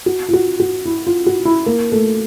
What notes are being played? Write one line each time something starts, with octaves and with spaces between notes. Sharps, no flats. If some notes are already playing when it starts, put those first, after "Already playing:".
F#4
F4
F#4
F#4
E4
F4
F#4
E4
A#3
A3